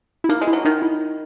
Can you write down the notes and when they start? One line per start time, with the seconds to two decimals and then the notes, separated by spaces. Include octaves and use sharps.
0.24 E4
0.29 A#3 D#4
0.42 G#3
0.47 E4
0.53 F#3
0.65 D#3 D#4
0.82 E4